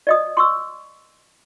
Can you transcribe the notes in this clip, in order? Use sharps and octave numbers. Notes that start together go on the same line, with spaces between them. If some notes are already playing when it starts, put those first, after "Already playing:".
D5 D#5 D#6
C6 C#6 E6